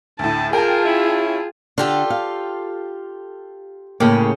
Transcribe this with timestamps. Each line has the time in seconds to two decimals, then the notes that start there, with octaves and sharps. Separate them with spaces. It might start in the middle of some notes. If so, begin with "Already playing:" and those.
0.19 D2 A2 A5
0.53 F4 G#4 A#4 G5 A5
0.85 C#4 E4
1.78 D3 F4 G4 A4
2.10 F5
4.00 A2 C#3 A#3 C#4 G4